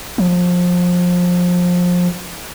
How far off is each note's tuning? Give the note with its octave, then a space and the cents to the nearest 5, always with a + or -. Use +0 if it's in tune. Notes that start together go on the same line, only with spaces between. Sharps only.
F3 +25